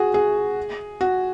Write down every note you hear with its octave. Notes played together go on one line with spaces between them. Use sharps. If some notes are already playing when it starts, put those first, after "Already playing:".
Already playing: F#4 G#4
G#4
F#4